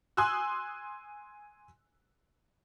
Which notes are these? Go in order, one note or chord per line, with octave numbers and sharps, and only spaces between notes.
G#5 C6 D#6 E6 F#6